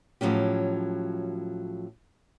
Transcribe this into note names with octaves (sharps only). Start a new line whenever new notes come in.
A2 F3 F#3 C#4 G4